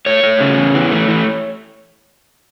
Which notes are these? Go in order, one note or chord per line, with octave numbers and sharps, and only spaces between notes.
A3 C#5
A3
C#3
E2
E3
A3
E3